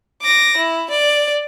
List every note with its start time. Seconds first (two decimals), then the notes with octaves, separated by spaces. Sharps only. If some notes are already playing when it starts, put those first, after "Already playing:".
0.23 D6 A#6
0.57 E4
0.91 D5